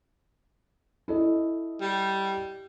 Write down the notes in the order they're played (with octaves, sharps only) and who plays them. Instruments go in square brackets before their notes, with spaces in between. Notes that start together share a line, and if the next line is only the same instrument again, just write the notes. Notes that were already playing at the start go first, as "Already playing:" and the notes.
[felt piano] E4 A4 D#5
[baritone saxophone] G3